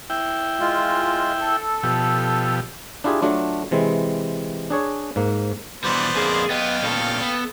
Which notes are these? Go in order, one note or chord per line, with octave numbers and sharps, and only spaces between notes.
E4 G5
G#3 F4
A4
B2 F3 G4
D4 E4 F4 G4 G#4
F#3 A3 D4 F4
C3 E3 G#3 C4
D4 G#4 C#5
G#2 A#3
B2 E3 G3 B3 C5 D5
F2 A#3 G#4
F#2 B3 D#5 F5 G5
A#2 B3 C#4 A4
B3